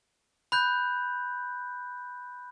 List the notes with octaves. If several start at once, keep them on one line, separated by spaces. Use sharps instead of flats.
B5 F#6 G6